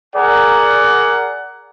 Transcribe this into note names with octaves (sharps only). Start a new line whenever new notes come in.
G#4 A#4 D5 F#5